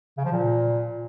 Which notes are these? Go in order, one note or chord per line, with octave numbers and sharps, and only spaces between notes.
C#3
F3
A#2